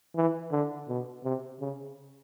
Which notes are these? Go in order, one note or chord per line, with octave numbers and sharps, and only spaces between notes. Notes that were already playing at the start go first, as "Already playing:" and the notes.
E3
D3
B2
C3
C#3